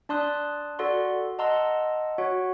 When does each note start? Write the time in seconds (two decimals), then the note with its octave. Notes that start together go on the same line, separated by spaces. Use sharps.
0.09 D4 D5 A5 C6 D#6 F#6
0.79 F#4 A4 D5 F#5 C6
1.39 D#5 F#5 A5 A#5 C6 E6
2.18 F#4 C#5 F#5